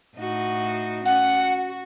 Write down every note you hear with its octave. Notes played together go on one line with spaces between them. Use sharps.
A2 D#4 F#4
C#4 F#5
F#4